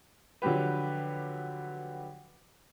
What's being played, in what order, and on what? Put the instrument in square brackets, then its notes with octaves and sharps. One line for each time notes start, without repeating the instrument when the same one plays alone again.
[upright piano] D3 F3 F#3 G4 B4